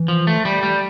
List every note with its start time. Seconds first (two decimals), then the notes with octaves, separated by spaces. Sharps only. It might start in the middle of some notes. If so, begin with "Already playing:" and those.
Already playing: E3
0.08 F3
0.27 A3
0.45 G3
0.63 G3